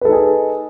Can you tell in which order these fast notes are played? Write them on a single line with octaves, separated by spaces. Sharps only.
B4 A4 D#4 G#4